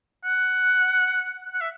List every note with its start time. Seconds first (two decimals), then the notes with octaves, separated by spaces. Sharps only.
0.25 F#5
1.54 F#5
1.61 E5